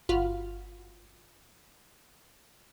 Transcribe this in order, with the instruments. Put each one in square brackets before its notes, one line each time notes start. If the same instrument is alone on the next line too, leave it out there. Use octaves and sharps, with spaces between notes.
[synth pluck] G1 F4 F#4 B5 F6